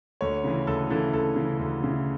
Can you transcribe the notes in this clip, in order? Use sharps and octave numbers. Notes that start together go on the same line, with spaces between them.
D2 C#5
C#3 E3
D2 A4
C#3 E3 A4
D2 A4
C#3 E3
D2
C#3 E3